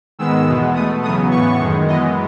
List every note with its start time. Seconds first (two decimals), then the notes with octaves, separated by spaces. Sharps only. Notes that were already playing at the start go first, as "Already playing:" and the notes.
0.19 G#2 D#3 G#3 B3 E6
0.46 E2 B2 G#3 B3
0.75 B2 A3 D#6
1.02 E2 C#3 F#3 B3 D#6
1.31 A2 E3 B3 C#6
1.60 F#2 D#3 G#3
1.88 F#2 E3 G#3 B3 D#5